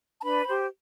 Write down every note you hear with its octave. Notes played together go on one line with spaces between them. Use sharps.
A5
D4 B4 B5
G4 C5